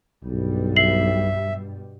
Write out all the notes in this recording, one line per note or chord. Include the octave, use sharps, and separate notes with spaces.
B1 G2 B2 G3
E5 C7 F#7